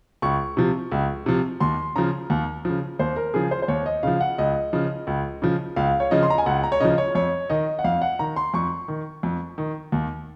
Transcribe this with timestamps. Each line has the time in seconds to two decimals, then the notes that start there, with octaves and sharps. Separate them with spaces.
0.22 C#2 C#6
0.57 C3 F3
0.92 C#2
1.26 C3 F3
1.60 D#2 C6
1.96 C#3 F3 A#5
2.30 D#2
2.65 C#3 F3
2.99 D#2 C5
3.17 A#4
3.34 C#3 F3 G#4
3.51 C5
3.62 C5
3.68 D#2 C#5
3.86 D#5
4.03 C#3 F3 F5
4.21 F#5
4.38 C#2 D#5
4.73 C#3 F3
5.07 C#2
5.42 C#3 F3
5.76 C#2 F5
6.00 C#5
6.11 C#3 F3 D#5
6.23 C6
6.30 A#5
6.38 G#5
6.46 C#2 F#5
6.63 A#5
6.72 C#5
6.80 C#3 F3 D#5
6.98 C#5
7.15 F2 C#5
7.50 D#3 D#5
7.79 F#5
7.84 F2 F5
8.02 F#5
8.19 D#3 A#5
8.36 C6
8.54 F2 C#6
8.88 D#3
9.23 F2
9.58 D#3
9.92 D#2